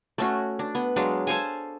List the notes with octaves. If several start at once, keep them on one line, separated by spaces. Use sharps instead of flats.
A3 C#4 F#4
D4
B3
F#3 G#3 D4 F5
A4 C5 F5 G#5